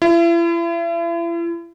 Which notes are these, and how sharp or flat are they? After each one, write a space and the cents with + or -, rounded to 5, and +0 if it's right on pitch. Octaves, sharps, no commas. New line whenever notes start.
E4 +40